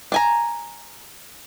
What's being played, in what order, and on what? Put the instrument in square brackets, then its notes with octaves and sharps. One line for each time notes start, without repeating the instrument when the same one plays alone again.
[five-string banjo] D4 G#5 A#5